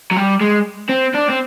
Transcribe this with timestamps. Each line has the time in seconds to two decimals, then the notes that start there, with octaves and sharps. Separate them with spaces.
0.11 F#3
0.17 G3
0.41 G#3
0.89 C4
1.14 D4
1.29 C4